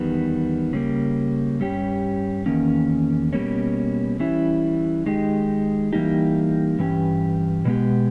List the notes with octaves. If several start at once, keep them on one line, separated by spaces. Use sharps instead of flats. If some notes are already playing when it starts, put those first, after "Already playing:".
Already playing: E2 D#3 G3 B3
C#3 G3 A#3
G2 G3 C#4 G4
E2 D#3 A#3 C#4
B2 G3 A#3 C#4
E3 G3 C#4 E4
D#3 G#3 D#4 G4
E3 G3 A#3 D#4 G4
G2 E3 C#4 G4
B2 G#3 B3 G4